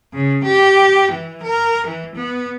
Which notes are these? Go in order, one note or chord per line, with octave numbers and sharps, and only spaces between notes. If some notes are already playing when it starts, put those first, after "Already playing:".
C#3
G4
E3
A#4
E3
B3